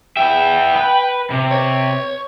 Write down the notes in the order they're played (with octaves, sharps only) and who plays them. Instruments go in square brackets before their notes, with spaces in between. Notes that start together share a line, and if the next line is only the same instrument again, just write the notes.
[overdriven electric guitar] B3 E5 [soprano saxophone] G5
[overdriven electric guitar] B4
C3
[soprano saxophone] C#5